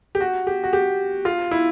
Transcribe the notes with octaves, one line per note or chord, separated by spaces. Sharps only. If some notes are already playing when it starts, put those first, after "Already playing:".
G4
F#4
G4
F#4
G4
F4
E4